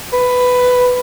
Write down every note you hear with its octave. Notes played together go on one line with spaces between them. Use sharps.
B4